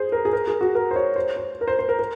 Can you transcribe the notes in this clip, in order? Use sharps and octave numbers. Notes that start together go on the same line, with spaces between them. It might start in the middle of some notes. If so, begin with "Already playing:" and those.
Already playing: G#4 C5
A#4
G#4
A#4
G#4
F#4
A#4
C5
C#5
C5
C5
A#4
C5
C5
A#4
A#4